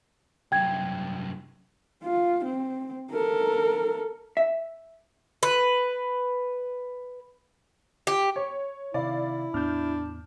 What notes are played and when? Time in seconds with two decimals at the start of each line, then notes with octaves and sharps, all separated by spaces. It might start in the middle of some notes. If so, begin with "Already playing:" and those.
0.52 C2 F#2 G5 G#6
2.04 F4
2.44 C4
3.11 A4 A#4
4.37 E5
5.43 B4
8.07 G4
8.36 C#5
8.94 C3 D#3 E4 D5 F5
9.54 E2 A2 B3 D4 F6 G6